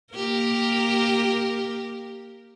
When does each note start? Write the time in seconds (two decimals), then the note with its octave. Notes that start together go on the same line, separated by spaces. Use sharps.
0.13 A#3 G4 A#4